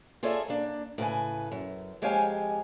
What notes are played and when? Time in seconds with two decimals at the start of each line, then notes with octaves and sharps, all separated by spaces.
0.23 F4 G#4 A4 C#5 D5 E5
0.48 A#3 D4
0.98 A2 C#3 B4 G#5
1.52 F#2
2.02 F2 G#3 G4 C#5 F5 G#5